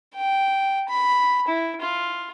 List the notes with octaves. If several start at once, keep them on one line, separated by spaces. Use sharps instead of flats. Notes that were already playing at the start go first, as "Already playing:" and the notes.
G5
B5
E4
F4